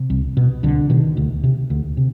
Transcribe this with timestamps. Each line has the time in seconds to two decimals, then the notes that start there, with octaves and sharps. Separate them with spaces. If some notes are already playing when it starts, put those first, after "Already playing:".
Already playing: C3
0.10 C2
0.37 B2
0.63 C2 D3
0.90 B2 D#3
1.17 D2
1.44 C3
1.70 D2
1.97 C3